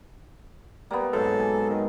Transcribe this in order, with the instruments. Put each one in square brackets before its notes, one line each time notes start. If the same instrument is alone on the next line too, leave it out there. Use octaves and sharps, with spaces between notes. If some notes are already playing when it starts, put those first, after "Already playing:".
[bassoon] G3 [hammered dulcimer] A#3 B3
[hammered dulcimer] G#2 F#3 [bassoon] A4
[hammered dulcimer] G#5
[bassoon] D#3